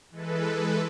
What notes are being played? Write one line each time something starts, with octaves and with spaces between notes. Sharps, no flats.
E3 G#3 A4 B4